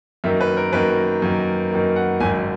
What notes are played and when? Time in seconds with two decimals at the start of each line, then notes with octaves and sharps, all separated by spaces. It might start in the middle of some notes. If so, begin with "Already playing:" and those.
0.24 F#2 D#3 A#3 E5
0.41 B4
0.57 A#4
0.73 F#2 D#3 A#3 B4
1.22 F#2 D#3 A#3
1.72 F#2 D#3 A#3
1.96 F#5
2.20 G#1 F#2 D#3 G#5